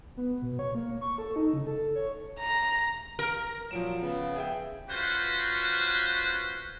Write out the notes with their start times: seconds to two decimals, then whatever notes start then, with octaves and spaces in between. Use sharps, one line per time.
0.17 B3
0.42 B2
0.59 C#5
0.75 A#3
1.01 C#6
1.18 A4
1.36 D#4
1.53 C#3
1.67 A4
1.95 C#5
2.39 A#5
3.19 A#4
3.71 A#2 F3 F#3 D7 E7
4.01 C#3 B3
4.36 G#4 E5 G5
4.88 C#4 F4 F#4 B4 C5